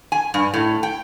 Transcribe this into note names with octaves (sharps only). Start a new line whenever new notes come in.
G#5
G2
A2
G5